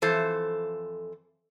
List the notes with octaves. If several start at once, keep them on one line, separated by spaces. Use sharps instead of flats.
F2 E3 A4 C5